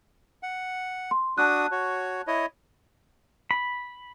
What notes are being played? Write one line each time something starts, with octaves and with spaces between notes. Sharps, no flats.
F#5
C6
D4 F#4 A5 D#6 F#6
F#4 C#5
E4 C#5 D#5
B5